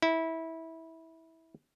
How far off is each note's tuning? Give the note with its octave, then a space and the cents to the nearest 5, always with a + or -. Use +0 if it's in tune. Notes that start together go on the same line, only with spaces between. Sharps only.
E4 -20